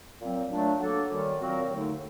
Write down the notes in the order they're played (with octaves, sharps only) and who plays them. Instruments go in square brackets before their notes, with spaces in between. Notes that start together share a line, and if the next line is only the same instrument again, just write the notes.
[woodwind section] A#2 F#3 C4
A#2 F#3 A3 D4
F#3 A#3 D4 A4
F#2 D#3 G3
A#2 F#3 C4 F#4 A#4
D#2 D3 A3 D#4